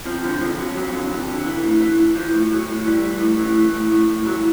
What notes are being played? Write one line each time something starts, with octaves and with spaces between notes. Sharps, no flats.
F2 F3
D3 F3
F2 F3
F2 F#3
F2 F#3
D3
F2
D3
E3
A2
E3
E3
E3 F3
A2
A2 F#3
A2
E3 G3
E3
A2
E3
E3
A2
A2
A2
E3 F#3